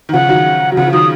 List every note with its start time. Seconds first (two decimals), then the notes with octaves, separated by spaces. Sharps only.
0.09 D#3
0.13 C#3 F3 F#5
0.29 D#3 F#3
0.72 F#3
0.77 C#3 F3 F#5
0.87 F3
0.92 D#3 F#3 D#6